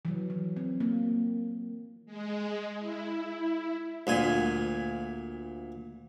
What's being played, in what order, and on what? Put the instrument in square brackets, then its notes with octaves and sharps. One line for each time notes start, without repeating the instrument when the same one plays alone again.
[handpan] E3 F#3
F#3
C4
A#3
[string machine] G#3
E4
[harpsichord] D2 A#2 G#5